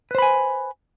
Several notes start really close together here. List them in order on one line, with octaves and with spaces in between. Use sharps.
B4 C5 B5 G#5